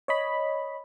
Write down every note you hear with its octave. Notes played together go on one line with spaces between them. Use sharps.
C#5 D#5 B5